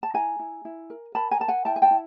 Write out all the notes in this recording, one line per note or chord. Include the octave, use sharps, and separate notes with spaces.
A5
E4 G#5 A#5
E4
E4
A#4
A#4 A5 B5
G#5 A#5
A#4 A5
F#5 G#5
E4 G5 A5
G#5
G5 A5
E4